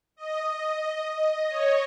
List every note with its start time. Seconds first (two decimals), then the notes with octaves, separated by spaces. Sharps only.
0.16 D#5
1.05 D#5
1.49 C#5